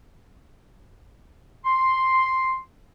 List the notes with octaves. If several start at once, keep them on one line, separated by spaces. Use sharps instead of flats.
C6